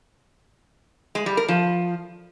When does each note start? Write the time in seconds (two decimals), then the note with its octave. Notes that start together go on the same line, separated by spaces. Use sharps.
1.15 G#3
1.26 G3
1.37 A#4
1.48 F3